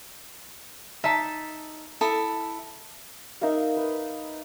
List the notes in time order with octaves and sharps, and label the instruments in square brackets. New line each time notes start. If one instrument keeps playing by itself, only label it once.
[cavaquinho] D#4 [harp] E5 A5
[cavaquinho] E4 A4 D#6
[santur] D#4 A#4 E5 F5
B4